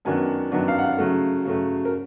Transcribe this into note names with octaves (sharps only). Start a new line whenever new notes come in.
F#2 D#3 F#3 B3 D4 G#5
F#2 D#3 F#3 B3 D4
F5
F#5
F5
C#3 F#3 A3
C#3 F#3 A3
A#4